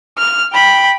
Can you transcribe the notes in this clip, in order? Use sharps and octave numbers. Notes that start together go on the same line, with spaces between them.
F6
G5 B5